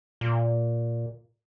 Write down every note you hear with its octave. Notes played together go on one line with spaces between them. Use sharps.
A#2